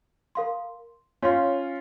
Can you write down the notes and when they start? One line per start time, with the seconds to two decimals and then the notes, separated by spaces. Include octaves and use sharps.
0.35 A#4 F5 C6
1.22 C#4 F4 C#5 F5 C6